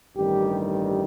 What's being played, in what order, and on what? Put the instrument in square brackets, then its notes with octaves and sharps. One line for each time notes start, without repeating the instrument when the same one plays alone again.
[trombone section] A1 G2 D#3 G3 G4